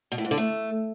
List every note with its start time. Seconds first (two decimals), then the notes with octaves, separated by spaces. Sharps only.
0.12 B2
0.18 A2
0.25 G#2
0.31 D3
0.38 A3